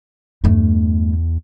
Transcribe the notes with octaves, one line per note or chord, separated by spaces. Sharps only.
E2 G2 A3